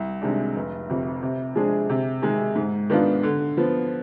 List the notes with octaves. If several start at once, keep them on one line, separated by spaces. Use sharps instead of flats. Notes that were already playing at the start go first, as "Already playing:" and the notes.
Already playing: C2
C3 D#3 G#3 D4
F1
F2 C3
C3
F3 G#3 D4 G#4
C3
D#3 G#3
G#2
D#3 B3 D4 F4
D3
F3 B3